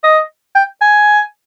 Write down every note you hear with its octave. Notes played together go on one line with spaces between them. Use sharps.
D#5
G5
G#5